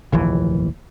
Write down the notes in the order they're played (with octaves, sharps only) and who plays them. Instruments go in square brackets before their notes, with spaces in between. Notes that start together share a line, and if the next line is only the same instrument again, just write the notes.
[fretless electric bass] F1 A#1 D#2 E3